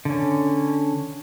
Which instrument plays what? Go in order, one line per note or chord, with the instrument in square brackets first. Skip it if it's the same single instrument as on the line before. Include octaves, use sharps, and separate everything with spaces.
[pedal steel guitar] D3 C#4